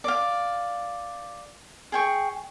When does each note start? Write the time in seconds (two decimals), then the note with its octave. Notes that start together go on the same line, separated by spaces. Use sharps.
0.04 D5 F5
1.92 G#4 G5 C#6